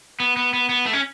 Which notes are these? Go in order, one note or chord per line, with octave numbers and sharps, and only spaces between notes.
B3
B3
B3
B3
A3
C#4